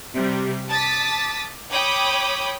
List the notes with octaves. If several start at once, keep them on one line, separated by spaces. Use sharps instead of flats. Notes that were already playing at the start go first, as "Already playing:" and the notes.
C3 G3
A5 D6 D#6 A6 B6
C#5 G5 B5 D6 D#6